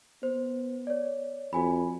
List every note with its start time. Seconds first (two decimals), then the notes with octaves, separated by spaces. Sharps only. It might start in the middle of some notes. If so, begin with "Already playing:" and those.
0.23 B3 C5
0.87 C#5 D5
1.53 F2 F#4 G#5 B5